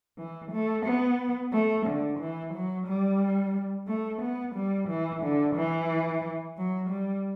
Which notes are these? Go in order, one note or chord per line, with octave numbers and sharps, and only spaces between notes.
E3
A3
B3
A3
D3
E3
F#3
G3
A3
B3
G3
E3
D3
E3
F#3
G3